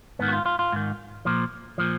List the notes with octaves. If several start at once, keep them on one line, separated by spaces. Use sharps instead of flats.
G#2 D#3 B3
F#4
F4
F4
F4
G#2 D#3
A#2 F3
A#2 F3